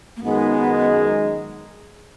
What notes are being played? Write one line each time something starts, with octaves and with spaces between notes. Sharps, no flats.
A#3
F#2 D#3 G#3 B3 D#4 G#4